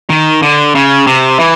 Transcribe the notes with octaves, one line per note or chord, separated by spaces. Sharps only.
D#3
D3
C#3
C3
E3